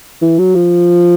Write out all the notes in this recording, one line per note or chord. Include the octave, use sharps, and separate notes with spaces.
E3
F#3
F3